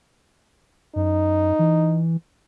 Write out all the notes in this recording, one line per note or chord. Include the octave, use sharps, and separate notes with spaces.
F#2 D#4
E3